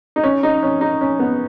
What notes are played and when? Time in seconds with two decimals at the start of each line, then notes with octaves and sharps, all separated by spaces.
0.16 D#4
0.23 C#4
0.43 D#4
0.63 C#4
0.81 D#4
1.01 C#4
1.19 B3